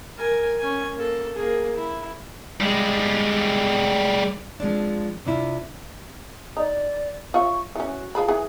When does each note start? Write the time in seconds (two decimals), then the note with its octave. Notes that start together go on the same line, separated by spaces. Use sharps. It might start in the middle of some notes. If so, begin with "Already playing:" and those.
0.17 A#4 G#5
0.59 C#4 G#5
0.96 A#3 A4
1.35 A#3 G#4
1.76 E4
2.61 G3 G#3
4.60 F3 G#3 C4 D4
5.25 C3 D4 E4 F4
6.57 D#4 D5
7.34 F4 C#5 E5 C#6
7.76 E3 C#4 F#4
8.15 F3 G#4 B5
8.28 E3 G#4